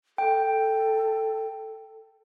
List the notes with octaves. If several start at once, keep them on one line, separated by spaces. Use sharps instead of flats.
A4 G5